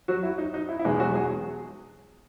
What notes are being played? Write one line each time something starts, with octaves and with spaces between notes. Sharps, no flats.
F#3 F#4
E4
D#4
D#4
E4
E4
E2 B2 G#3 B3 D#4
F#3 F#4
G#3 G#4